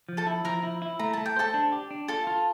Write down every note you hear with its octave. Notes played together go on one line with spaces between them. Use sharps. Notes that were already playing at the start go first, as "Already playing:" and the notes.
F3
A4 A5
E4
F3 A#4 A#5
E4
E4
A3 A#5
A3 A5
G5
A4 C5 A5
D4
G4
D4
F4 A4 A5
F4